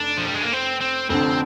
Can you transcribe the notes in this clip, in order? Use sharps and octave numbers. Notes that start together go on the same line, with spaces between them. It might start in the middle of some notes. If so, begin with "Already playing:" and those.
Already playing: F1 D4
F3
G3
G#3
A#3
C4
C4
F1 F2 D3 C4